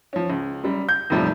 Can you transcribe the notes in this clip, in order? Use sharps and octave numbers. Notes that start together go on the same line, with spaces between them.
F3 C#4
C#2
F#2 G3
G6
D#2 A2 C3 F3 G3